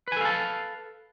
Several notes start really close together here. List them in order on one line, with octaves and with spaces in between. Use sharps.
B4 G#5 A4 F5 A5